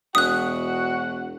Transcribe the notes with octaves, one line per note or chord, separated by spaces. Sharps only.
E1 F#4 F#5 D#6 F#6